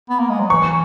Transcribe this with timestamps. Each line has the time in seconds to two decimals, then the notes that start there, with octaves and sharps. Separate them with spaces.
0.09 B3
0.19 A#3
0.29 G#3
0.40 F#3
0.50 E3 C#6